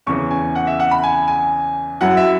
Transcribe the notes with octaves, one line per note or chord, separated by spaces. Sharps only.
E2 C#3 E3 C#4 C#6
G#5
F#5
E5
F#5
B5
G#5
G#5
F#2 F#3 E4 F#5
E5